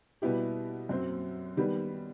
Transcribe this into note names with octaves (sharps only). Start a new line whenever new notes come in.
B2 G3 B3 E4 G4
F#2 F#3 C4
D#3 G3 B3